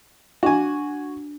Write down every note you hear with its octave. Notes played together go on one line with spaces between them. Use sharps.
D4 F#4 G#5